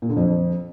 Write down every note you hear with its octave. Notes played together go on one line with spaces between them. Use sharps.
A#2
D3
F2